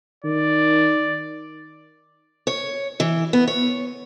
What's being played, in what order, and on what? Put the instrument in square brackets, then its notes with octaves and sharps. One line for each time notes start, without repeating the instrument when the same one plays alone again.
[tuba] D#3 [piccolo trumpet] D5
[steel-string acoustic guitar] C#5
E3
B3
C#5